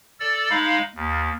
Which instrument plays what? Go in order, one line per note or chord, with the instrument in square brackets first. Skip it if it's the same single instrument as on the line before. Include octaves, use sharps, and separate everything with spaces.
[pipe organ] A4 D5 E6
G#3 D#4 F5 B5
D#2